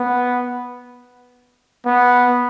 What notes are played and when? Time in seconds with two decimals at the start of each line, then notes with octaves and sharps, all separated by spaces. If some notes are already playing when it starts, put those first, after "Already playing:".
Already playing: B3
1.85 B3